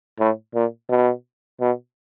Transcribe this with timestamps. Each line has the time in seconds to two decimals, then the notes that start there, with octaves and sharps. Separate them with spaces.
0.19 A2
0.54 A#2
0.89 B2
1.61 B2